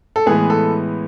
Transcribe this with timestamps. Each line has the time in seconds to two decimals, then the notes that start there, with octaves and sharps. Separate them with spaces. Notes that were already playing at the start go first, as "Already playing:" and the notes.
0.16 A4
0.26 A2 E3 G#3 B3 G#4
0.50 A4